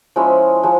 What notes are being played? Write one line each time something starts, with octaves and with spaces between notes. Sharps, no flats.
F3 G#3 C#4 E4
F3 G#3